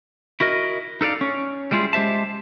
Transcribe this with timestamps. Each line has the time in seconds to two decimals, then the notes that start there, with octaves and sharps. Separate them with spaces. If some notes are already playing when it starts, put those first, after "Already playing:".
0.40 E4 F#4 A#4 D#5
1.01 D#4 A4 B4 D5 F5
1.21 C#4
1.71 G3 G#3 E4 F4 G#4
1.93 G#3 G4 C5 E5 A5